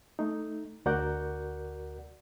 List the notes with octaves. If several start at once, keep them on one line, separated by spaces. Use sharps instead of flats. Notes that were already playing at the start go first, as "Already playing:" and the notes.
A3 D#4
D2 F#4 A#4 D5 F#5 G6